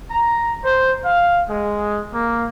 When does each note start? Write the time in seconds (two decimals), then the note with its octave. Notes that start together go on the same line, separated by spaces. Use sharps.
0.10 A#5
0.64 C5
1.04 F5
1.48 G#3
2.14 A#3